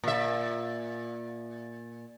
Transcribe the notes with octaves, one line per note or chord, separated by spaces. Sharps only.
A#2 E5